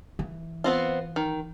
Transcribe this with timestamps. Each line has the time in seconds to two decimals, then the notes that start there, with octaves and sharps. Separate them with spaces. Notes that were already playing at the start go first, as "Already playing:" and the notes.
0.19 E3
0.64 B3 C4 F4
1.16 D#3